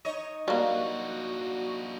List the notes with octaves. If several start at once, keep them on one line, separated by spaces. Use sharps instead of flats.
D#4 C#5 D#5
G3 A#3 D4 F4 F#4